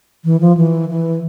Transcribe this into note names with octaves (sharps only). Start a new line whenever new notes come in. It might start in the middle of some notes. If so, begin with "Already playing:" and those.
E3
F3
E3
E3